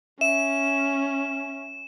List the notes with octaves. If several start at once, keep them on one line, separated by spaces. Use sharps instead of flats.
C#4 E5 E7